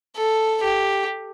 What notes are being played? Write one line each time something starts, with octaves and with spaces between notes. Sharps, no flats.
A4
G4